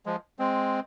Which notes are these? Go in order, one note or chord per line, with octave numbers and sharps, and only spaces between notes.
F3 G#3
G#3 C4